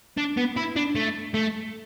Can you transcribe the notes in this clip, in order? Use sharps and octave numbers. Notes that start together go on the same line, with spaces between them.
D4
B3
E4
D4
A3
A3